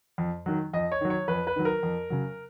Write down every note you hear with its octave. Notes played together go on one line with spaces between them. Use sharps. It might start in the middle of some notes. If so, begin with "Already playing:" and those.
F2
D#3 F#3
F2 D#5
C#5
D#3 F#3
C#5
F2 B4
B4
D#3 F#3
A#4
F2
C#3 F#3